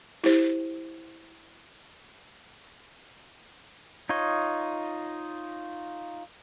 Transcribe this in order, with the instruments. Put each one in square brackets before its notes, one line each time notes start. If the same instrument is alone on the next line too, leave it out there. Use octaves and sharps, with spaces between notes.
[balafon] E4 G4 C5
[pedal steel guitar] D#4 F4 C#5 D#5